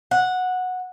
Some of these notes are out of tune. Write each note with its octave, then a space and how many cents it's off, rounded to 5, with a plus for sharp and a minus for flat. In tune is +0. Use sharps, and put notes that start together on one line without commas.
F#5 -10